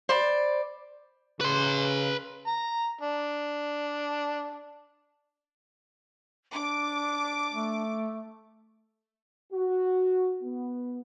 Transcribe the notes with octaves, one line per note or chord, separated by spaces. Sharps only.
C5 D5 B5
C#3 B4 C6
A#5
D4
D4 D6
A3
F#4
B3